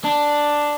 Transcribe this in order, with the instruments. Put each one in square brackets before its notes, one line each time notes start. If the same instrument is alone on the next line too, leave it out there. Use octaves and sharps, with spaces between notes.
[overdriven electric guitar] D4